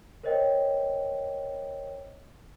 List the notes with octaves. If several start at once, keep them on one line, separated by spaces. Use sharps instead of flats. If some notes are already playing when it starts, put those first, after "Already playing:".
A#4 C5 C#5 D#5 G5